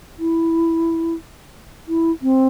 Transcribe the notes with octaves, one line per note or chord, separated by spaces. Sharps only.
E4
E4
C4